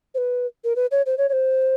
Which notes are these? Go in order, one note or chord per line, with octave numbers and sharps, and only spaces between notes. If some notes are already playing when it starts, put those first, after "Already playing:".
C5
B4
A#4
B4
C#5
C5
C#5
C#5
C5